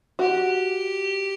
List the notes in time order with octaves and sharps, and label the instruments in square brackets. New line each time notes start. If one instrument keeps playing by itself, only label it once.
[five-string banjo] F#4 [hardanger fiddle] G4